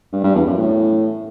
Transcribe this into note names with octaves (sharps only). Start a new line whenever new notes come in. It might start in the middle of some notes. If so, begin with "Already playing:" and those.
G2
G2
E2
F#2
A2